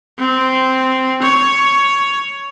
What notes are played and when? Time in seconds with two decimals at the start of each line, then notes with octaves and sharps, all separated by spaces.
0.19 C4
1.22 C#5